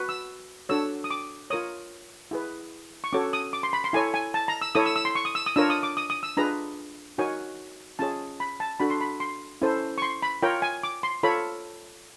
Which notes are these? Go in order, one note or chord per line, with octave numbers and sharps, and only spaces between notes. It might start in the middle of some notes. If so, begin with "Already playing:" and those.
Already playing: F#4 B4
E6
D4 F#4 A4 C#5 E6
D#6
D6
F4 A#4 C#5 D#6
E4 G#4 B4
C#6
C#4 F#4 A4 C#5 D6
D#6
D6
C6
B5
C6
E4 A4 C#5 G#5
G#5
A5
A#5
E6
E4 A4 C#5 D#6
E6
E6
C6
C#6
D#6
E6
D#6
D4 F4 A#4 C#5 E6
D#6
D6
D#6
D#6
E6
D4 F4 G#4 B4 A#5
D#4 F#4 A#4 C#5 G#5
C#4 F4 G#4 C#5 A5
B5
A5
D4 F#4 A4 B5
C6
B5
C6
C#4 E4 A4 C5
C#6
C6
B5
F4 A#4 C#5 G5
G#5
D6
C6
F4 A4 C#5 B5